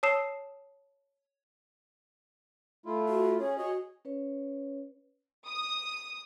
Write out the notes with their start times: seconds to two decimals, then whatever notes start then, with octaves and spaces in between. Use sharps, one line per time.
0.03 C#5 A5 D#6 E6 C7 E7
2.86 A3 E4 F4
3.09 F#4
3.39 C#4 G#4 C#5
3.58 F#4 G#4 C#5 D#5
4.05 C#4 B4 C#5
5.47 D#6